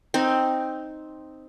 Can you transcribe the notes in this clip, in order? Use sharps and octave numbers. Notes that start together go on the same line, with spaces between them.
C4 D#4